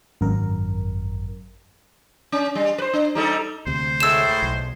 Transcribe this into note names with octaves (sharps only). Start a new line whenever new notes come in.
G#1 F#2 A#4
C#4
G3
B4 C5
D4
G3 D#4 A4
D2 C3 C5
A2 G#3 E6 E7
B1